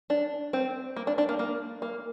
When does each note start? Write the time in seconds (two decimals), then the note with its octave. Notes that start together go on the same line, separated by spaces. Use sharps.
0.10 D4
0.53 C4
0.96 A#3
1.07 D4
1.18 D4
1.29 A#3
1.39 A#3
1.82 A#3